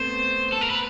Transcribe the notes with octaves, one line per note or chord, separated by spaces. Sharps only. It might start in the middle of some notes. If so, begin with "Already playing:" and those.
Already playing: A3 B3 C4 C5
A4
A#4
B4